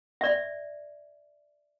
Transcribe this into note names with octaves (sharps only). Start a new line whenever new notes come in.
D5 E5